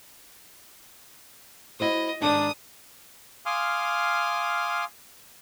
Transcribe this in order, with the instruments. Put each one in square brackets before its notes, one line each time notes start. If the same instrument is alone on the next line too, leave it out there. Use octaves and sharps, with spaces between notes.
[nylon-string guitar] E4 F#4 C5 [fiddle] D#5
[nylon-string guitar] G#2 D#3 A5 [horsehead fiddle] D4 [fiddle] D#6
[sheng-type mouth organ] F5 G#5 C6 D6 D#6 F6